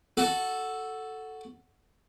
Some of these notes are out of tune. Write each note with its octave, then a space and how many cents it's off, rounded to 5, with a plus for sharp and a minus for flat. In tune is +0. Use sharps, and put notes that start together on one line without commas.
F#4 +0 A4 +0